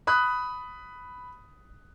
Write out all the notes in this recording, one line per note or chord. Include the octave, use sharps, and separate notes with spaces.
B5 D#6 F#6